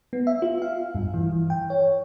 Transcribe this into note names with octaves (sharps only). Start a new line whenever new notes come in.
B3
E5
F4
F5
G2
E3
E3
G5
C#5